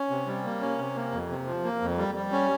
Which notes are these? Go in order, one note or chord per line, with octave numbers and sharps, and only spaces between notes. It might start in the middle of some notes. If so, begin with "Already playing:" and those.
Already playing: C#4
C3
G3
A#3
C#4
C3
A#3
F2
C3
F3
A#3
F2
G3
G3
C#4